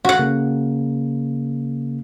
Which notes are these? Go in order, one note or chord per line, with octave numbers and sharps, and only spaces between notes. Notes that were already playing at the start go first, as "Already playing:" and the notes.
F#4 F#5
C#3 A#3